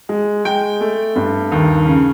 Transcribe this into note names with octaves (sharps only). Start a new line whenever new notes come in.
G#3
G#3 G5
A3
G2
D#2
C#3